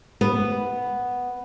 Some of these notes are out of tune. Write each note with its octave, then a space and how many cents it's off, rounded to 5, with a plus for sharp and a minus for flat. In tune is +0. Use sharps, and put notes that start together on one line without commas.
B3 +0